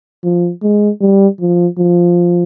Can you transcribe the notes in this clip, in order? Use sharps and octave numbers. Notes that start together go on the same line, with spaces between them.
F3
G#3
G3
F3
F3